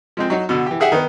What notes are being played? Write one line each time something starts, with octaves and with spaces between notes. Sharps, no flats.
F3 G#3 C4
F#3 D#4 F#4
B2 D3
E3 G4
G4 G#4 E5 F#5
D#3 B3